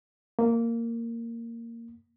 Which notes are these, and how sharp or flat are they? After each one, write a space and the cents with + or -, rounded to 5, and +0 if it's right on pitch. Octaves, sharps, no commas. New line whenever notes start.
A#3 -10